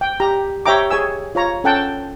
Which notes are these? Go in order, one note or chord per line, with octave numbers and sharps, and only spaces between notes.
G5
G4 A#5
G4 C#5 E5 G5 A#5 D6
G#4 C#5 G#5 E6
F4 C#5 A#5
C#4 A4 F#5 G5 A5